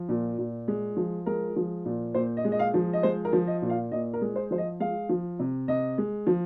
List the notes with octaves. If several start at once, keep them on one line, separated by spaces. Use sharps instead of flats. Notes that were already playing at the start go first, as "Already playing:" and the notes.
Already playing: F3
A#2
A#2
G#3
F3
G#3 A#4
F3
A#2
A#2 C5
D#5
G#3
D#5
F5
F3
D#5
G#3 C5
A#4
F3
D#5
A#2
F5
A#2 D#5
A#4
G#3
C5
F3 C5
D#5
G#3 F5
F3
C3
C3 D#5
G#3
F3